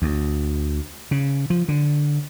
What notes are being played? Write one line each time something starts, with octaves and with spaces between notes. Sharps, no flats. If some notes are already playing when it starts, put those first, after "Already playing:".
D2
C#3
F3
D3